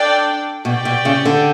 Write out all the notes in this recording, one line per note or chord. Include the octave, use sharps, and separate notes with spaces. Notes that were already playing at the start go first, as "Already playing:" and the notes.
Already playing: D4 A4 D5 G5
B2 G4 D5 G5
B2
C#3
D3